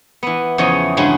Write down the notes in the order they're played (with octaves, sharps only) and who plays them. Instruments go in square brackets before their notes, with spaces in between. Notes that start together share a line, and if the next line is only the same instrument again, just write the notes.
[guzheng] E3 B3
E2 C#3 E3 F3 C#5 D#5
G2 C#3 G#3 F#4